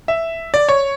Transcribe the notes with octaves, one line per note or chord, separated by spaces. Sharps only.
E5
D5
C#5